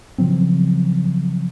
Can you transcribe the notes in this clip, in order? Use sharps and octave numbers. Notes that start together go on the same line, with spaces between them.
C#3 F3 F#3 C4